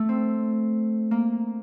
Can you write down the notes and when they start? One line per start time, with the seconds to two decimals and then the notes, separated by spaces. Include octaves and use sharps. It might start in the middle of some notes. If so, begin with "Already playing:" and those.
Already playing: A3
0.09 C4
1.11 A#3